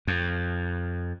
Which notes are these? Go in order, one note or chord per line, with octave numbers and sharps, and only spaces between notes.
F2